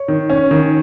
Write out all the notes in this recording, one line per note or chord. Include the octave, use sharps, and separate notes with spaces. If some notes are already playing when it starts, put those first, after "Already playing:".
Already playing: C#5
D#3
C#4
D#3